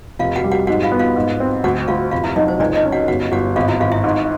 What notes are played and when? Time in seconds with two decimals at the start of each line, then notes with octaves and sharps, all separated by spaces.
0.19 F1 F4 F5
0.36 F#4 F#5
0.44 G3
0.52 F#4 F#5
0.67 G#2 F#4 F#5
0.83 F4 F5
0.92 B3
0.99 F4 F5
1.16 G#2
1.40 C4
1.64 D2 F#4 F#5
1.88 D2 F4 F5
2.11 F1 F4 F5
2.24 E4 E5
2.36 F#3 D#4 D#5
2.48 C5
2.60 C#2 D4 D5
2.76 D#4 D#5
2.85 C#4
2.92 F#4 F#5
3.08 G1 F#4 F#5
3.32 G1 F#4 F#5
3.56 G#1 F4 F5
3.68 E4 E5
3.80 G#1 F4 F5
3.92 E4 E5
4.04 G#2